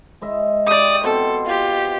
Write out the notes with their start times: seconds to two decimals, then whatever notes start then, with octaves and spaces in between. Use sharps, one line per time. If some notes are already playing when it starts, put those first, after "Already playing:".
0.21 G#3 D#5 E5
0.67 G4 D5 C#6 D#6
1.04 B2 C4 A4 C6
1.46 F4 G4